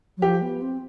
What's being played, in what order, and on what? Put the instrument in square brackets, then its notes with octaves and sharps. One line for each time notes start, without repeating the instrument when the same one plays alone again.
[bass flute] F#3
[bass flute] F3 [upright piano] G4
[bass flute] B3
C4